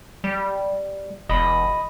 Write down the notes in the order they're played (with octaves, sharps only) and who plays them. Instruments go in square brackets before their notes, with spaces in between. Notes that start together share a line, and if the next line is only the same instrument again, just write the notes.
[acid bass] G3
[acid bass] E1 [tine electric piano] D#5 B5